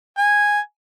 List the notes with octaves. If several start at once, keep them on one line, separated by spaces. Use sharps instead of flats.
G#5